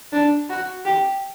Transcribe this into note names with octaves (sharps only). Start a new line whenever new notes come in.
D4
F#4
G4